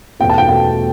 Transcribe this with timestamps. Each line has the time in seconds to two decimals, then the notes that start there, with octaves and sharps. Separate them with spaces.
0.20 E2 B2 A3 G5
0.30 A5
0.38 G5
0.48 E2 B2 A3 G5